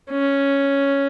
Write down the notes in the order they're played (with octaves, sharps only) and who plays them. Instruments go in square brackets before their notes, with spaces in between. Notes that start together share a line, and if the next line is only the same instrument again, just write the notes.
[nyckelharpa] C#4